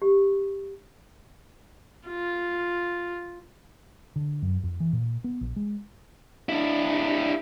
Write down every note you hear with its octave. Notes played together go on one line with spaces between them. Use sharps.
G4
F4
D3
F#2
F2
E3
A#2
B3
A#1
G#3
D4 E4